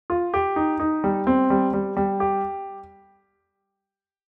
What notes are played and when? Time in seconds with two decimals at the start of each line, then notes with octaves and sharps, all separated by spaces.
0.10 F4
0.34 G4
0.56 D#4
0.80 D#4
1.04 G3
1.27 C4
1.50 G3
1.73 G3
1.97 G3
2.20 G4